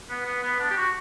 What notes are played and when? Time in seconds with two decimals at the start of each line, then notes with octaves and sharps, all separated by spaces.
0.09 B3
0.26 B3
0.43 B3
0.60 D4
0.70 G4
0.76 F#4